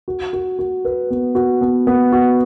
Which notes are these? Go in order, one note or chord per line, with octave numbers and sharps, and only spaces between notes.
F#4
F#4
F#4
B4
B3
F#4
B3
B3
F#4